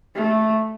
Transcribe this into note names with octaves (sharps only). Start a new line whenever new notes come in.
A3